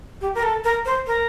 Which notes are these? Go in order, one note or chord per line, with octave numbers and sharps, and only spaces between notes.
G4
A#4
A4
A#4
C5
A#4